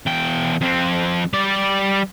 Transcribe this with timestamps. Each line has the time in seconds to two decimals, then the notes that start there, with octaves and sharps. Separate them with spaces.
0.06 E2 G5
0.61 F2 C4
1.34 G3 D5